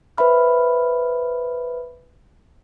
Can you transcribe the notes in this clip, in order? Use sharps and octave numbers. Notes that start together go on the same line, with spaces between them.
B4 C5 E5 B5 F6